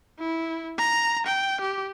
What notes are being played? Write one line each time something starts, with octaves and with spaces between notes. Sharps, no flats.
E4
A#5
G5
G4